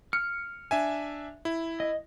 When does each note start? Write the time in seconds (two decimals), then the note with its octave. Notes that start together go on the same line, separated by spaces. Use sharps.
0.13 F6 C#7
0.71 D4 E5 G#5
1.45 E4
1.80 D#5